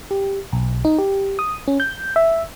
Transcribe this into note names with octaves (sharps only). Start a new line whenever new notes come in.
G4
B1
D#4
G4
D#6
C#4
G6
E5